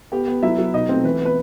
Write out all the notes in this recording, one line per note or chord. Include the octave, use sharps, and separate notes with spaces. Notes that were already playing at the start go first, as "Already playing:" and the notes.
B3 G4 G5
B3
F#3 E4 E5
F#3
B2 D#4 D#5
A3 C4 C5
E3 B4
B3 B4